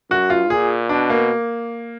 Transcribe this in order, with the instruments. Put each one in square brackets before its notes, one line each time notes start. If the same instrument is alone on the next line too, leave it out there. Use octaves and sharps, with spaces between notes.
[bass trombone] F#2 [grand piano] F#4
[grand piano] F4
[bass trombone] A#2 [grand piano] G#4
[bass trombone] B2 [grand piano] D4
[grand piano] A#3